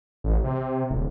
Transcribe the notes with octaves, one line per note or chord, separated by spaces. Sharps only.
A1
C3
D1